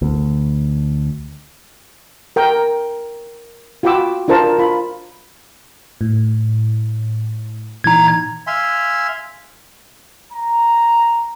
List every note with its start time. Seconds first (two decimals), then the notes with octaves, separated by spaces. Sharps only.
0.02 D2
2.36 A#4 G5
3.83 F4 F#4 G5 B5 D6 E6
4.28 D4 F4 A#4 C5 A5
4.58 F4 B5
6.01 A2
7.84 A#2 E3 D#4 A#5 G#6
8.47 E5 F5 G#5 C6
10.33 A#5